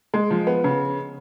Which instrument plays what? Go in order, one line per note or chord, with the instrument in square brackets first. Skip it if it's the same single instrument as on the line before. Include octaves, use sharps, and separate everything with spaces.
[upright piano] G#3
F3
B3
C#3